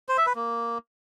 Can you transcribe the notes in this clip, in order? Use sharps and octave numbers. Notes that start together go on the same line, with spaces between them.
C5
E5
B4
A#3